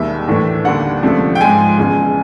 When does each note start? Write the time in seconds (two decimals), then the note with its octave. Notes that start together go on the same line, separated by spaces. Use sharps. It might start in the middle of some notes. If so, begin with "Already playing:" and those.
Already playing: E1 D#2 D#3 G3 E5
0.28 A2 E3 A3 D4
0.65 D#2 D3 G3 A#3 D4 F#5
1.03 C#2 C3 F3 A3 D4
1.35 G5
1.40 G#2 F3 G#3 G#5
1.77 E1 E2 C#3